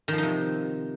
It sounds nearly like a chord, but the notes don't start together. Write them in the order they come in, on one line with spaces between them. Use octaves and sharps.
D#3 F3 D#4 C3